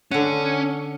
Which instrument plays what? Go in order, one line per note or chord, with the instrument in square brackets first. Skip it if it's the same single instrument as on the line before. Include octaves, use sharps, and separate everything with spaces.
[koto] D3 F#5 [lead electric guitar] C#4